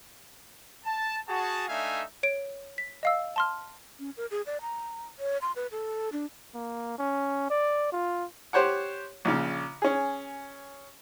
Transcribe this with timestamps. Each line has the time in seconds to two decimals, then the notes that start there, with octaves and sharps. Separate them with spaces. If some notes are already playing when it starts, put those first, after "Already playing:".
0.85 A5
1.28 F#4 G#4 A5
1.69 A3 D4 D#4 E5 F5 G#5
2.23 C#5 D7
2.78 B6
3.03 D#5 F5 E6
3.36 A5 C6 F6
3.99 C#4
4.17 A#4
4.31 G#4
4.46 D5
4.61 A#5
5.19 C#5
5.42 C6
5.56 B4
5.71 A4
6.13 D4
6.54 A#3
6.98 C#4
7.50 D5
7.92 F4
8.53 G4 C5 C#5 F#5
9.25 A#1 C#3
9.82 C#4 G#4